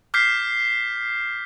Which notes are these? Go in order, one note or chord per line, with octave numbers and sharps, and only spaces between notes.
D6 F6 G6 B6 C7